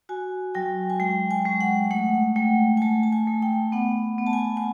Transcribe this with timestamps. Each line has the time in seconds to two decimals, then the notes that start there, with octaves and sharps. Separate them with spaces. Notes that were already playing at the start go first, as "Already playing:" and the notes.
0.09 F#4 G#5
0.55 F#3 G5
0.90 G#5
1.00 G#3 G5
1.31 G#5
1.46 G#3
1.61 F#5
1.91 A3 F#5
2.36 A3 G5
2.77 G#5
2.82 A3 A5
3.03 A5
3.13 G#5
3.27 A3
3.42 G5
3.72 B3 F#5
4.18 B3
4.26 A5
4.33 G#5
4.57 G#5